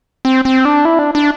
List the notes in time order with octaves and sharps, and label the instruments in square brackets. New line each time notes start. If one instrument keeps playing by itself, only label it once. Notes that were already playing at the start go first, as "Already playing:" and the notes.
[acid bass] C4
C4
D4
E4
D4
D4